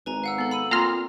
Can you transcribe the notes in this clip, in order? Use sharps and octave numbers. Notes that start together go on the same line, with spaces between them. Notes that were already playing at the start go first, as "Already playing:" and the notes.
G#1 B4 G#5 A#5
F5 F#5 E6
B3 A4 F5
B5 E6 D#7
A#2 A#3 C4 F4 A#5 C6 F6